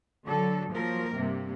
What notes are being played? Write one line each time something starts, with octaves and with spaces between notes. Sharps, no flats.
D3 F#3 A4
F3 F#3 A#3 A#4
G2 C3 A#3